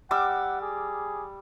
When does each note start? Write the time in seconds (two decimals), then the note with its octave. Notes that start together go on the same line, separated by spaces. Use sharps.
0.11 G3 F#5 D6 E6
0.62 G#4